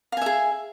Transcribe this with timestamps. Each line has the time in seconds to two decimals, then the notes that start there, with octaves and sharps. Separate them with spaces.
0.12 F5
0.17 G#5
0.22 E5
0.26 G#4